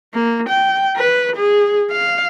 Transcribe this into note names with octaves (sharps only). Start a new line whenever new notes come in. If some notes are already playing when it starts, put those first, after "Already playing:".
A#3
G5
B4
G#4
F5